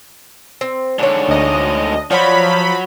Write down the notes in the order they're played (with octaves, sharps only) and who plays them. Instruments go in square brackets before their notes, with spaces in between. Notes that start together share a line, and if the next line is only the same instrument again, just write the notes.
[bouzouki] C4
[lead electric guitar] G#2 D3 [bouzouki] D4 C#5
[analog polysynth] D2 D#5
[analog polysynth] F3 B5 [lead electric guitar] F#3 [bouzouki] F#4 C#5 D5